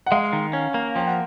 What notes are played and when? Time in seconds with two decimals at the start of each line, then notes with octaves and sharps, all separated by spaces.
0.06 F#5
0.11 G#3 F5
0.33 D#3
0.53 C#4
0.74 A#3
0.96 F3 G5
1.07 F#5